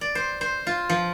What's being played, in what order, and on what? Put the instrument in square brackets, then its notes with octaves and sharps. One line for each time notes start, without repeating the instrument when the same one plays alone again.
[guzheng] D5
C5
C5
F4
F3